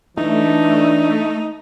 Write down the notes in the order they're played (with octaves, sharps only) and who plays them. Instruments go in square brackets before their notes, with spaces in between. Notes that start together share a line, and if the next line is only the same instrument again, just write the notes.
[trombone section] E3 D4 [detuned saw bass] A3 [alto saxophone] D#4